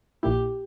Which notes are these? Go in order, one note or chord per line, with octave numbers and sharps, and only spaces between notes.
A#1 A#2 A#3 E4 G4